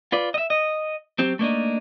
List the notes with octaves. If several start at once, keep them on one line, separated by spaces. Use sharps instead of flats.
F4 B4 D5
D#5 E5
D#5
F#3 C4 G4
A3 A#3 D4 D#4